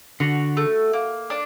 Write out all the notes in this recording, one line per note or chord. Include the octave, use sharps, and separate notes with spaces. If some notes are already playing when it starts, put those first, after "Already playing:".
D3 F#4
A3
A#3
D4